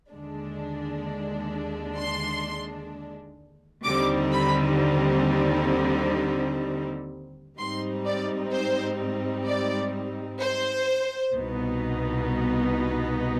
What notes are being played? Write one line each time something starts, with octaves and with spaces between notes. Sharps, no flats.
D#2 D3 G#3 D4
C6
D#2 D3 G3 C4 D#4 D6
B5
G#2 G3 C4 D#4 C6
D5
C5
D5
C5
C2 B2 B3 D#4